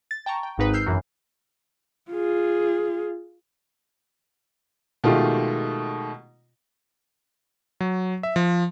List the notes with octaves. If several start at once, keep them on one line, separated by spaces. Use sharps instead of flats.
A6
G5 A5 A#5 C#6
G5
G#1 G#2 D#4 B4
E6 F6 G6 C7
F#2 E3 F#3
F4 G#4
B2 D#3 G#3 A3 F4 G4
F#3
E5
F3